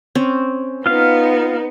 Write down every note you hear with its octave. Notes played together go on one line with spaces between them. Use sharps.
C4 C#4
B3 D#4 F4 F5